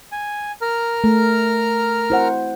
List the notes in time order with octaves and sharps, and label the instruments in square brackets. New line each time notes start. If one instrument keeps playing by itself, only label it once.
[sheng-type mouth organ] G#5
A#4 A#5 F6
[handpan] A3
E4 C5 F#5